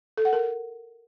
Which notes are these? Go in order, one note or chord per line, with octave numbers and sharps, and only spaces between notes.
A4
F#5
A#4